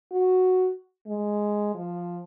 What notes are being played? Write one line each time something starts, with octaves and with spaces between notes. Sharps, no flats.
F#4
G#3
F3